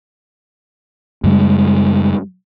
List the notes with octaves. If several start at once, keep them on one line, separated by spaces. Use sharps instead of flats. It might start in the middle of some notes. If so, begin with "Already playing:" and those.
F#2 C#3 G3 G#3